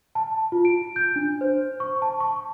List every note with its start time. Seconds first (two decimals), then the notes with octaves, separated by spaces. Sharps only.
0.15 A5
0.52 F4
0.65 D7
0.96 G6
1.16 D4
1.41 C5
1.80 C#6
2.02 A5
2.20 C#6